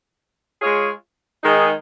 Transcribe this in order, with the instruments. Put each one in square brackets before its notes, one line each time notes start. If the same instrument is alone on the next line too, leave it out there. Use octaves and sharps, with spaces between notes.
[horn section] G#3 F4 G#4 C#5
D#3 G#3 D#4 G#4